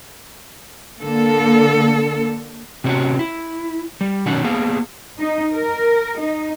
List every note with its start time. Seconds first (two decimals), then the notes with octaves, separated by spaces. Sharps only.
1.01 D3 A#3 A4
2.84 C3 C4 C#4 F#4
3.19 E4
4.01 G3
4.26 B2 D#3 F#3 C#4 D#4 F#5
4.44 A#3 B3 G#4 F5
5.19 D#4
5.53 A#4
6.18 D#4